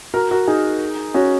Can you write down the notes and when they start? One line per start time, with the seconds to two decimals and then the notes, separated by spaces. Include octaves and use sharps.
0.14 F#4 A#4
0.31 F#4 A#4
0.48 D#4 G#4
1.14 C#4 F#4